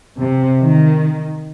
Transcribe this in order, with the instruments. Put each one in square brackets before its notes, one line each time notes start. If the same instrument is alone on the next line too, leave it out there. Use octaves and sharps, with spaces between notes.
[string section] C3
D#3